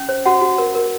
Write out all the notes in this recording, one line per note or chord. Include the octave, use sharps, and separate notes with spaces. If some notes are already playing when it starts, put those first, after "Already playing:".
Already playing: C#4
C5
F#4 F#5
F#4
A#4
A#4